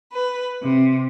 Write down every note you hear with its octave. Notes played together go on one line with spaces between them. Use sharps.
B4
C3